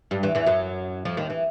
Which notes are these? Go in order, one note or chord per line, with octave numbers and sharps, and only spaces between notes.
G2 G3
E2 E3
E2 E3
F#2 F#3
F2 F3
D#2 D#3
E3